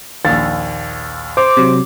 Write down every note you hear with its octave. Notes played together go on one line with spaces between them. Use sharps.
A#1 D#2 A6
C5 D6
C3 F#3